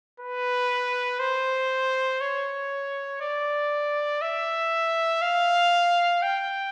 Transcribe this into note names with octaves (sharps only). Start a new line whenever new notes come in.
B4
C5
C#5
D5
E5
F5
G5